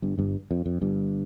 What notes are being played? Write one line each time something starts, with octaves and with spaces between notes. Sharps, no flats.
G1 G2
G1 G2
F2
F2
G1 G2